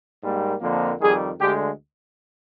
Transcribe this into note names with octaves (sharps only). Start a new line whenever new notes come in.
G#2 G3 A#3
F2 D3 F3 A#3
F2 D#3 G3 G#4
D2 D3 G#3 G4